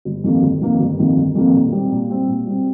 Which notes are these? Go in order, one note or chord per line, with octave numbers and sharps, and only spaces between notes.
G1
F2 C3 D#3 A#3
G1
F2 C3 D#3 A#3
G1
F2 C3 D#3 A#3
G1
F2 C3 D#3 A#3
A#2
G3 C4
A#2
G3 C4
A#2
G3 C4